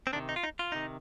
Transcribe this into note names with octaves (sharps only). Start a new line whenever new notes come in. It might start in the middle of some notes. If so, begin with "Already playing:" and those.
C4
C3 D#3 D4
D#4
F4
D#4
F4
C3 D#3 D#4